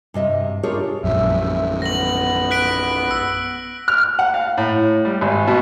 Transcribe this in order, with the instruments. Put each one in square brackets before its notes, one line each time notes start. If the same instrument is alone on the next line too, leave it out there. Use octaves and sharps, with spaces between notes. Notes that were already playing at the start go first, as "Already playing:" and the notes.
[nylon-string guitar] G2 C3 D#5 E5
D4 F4 G4 G#4 A#4 C#5
[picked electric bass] A#1 F#2 [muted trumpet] E5
[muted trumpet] B3 [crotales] A#6 F#7
[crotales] F#6 B6 D7
E6
[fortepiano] F6
F#5
F5
A2
G3
G#1
B2